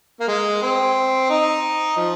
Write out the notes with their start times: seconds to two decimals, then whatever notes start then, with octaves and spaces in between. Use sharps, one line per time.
0.20 A#3
0.28 G#3
0.62 C4
1.30 D#4
1.97 F3